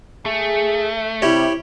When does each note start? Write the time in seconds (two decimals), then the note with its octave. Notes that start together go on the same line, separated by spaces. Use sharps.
0.26 A3 G#4
1.22 C3 G3 E4 G4 C#5